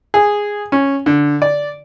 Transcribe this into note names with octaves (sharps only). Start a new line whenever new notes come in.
G#4
C#4
D3
D5